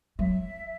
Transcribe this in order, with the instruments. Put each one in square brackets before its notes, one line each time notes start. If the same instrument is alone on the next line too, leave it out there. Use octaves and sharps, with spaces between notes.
[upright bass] F#3 [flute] E5